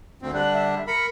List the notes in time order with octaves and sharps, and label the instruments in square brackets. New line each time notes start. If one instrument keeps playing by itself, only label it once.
[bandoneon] D2 C4
[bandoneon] D3 G3 D4 [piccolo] F#6
[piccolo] E5
[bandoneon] A#4 B5 [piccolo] C#7